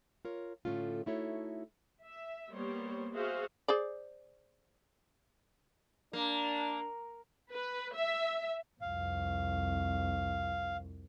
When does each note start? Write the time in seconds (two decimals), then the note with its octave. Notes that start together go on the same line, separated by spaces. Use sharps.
0.25 F4 A#4 C#5
0.65 A2 D3 A3 C#4 F4
1.06 A3 D#4 E4 F#4 A4 C#5
2.03 E5
2.51 G3 A#3 B3 C5 C#5
3.13 F#4 G#4 C5 E5 F5
3.68 G#4 C5 D5
6.13 A#3 D4
7.52 B4
7.96 E5
8.81 C2 F2 F5